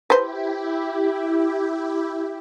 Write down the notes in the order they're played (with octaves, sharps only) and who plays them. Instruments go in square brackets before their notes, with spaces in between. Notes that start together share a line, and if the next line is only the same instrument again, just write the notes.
[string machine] E4 G4 [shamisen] B4 C5